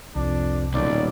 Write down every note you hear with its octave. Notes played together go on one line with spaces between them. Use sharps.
C2 F2 D4
D#1 B1 D5